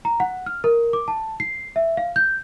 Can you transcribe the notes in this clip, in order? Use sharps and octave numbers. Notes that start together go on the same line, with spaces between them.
A#5
F#5
F6
A#4
D6
A5
C7
E5
F5
G6